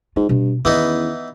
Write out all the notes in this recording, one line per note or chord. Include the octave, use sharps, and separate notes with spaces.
G#2 F4
G2 B2
E2 D#3 E3 B3 C#4 D#4